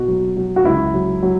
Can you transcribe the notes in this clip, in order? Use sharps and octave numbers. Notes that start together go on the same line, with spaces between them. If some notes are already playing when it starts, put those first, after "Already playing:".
Already playing: B2 F#4
F#3
F#3
F#4
C#2 E4
F#3
F#3